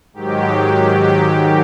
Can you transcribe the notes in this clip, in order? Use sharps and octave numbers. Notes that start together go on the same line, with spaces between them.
G#2 D#3 F#3 G4